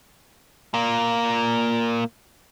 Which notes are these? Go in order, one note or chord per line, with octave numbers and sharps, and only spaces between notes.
A#2 A#3